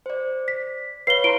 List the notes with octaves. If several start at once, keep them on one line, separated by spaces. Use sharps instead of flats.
C5 D5
B6
B4 C#5 F5 C7 G7
E4 A#5 C6 D7